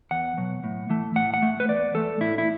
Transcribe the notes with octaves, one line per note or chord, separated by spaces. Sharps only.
E2 F#5
B2 F#3
A2
E3 A3
A2 F#5
F#5
A3
B4
E2 D5
E3 A3 A4
A2 E4
E4